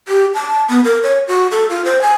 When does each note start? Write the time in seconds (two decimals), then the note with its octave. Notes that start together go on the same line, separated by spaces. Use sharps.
0.08 G4
0.35 A5
0.69 B3
0.84 A#4
1.03 C#5
1.28 F#4
1.51 A4
1.70 F4
1.85 C5
2.02 G#5